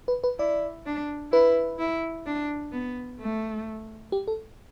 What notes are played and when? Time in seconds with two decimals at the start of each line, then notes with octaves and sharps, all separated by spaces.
0.08 B4
0.24 B4
0.39 E4 D5
0.86 D4
1.32 E4 B4
1.79 E4
2.26 D4
2.72 B3
3.19 A3
4.12 G4
4.28 A4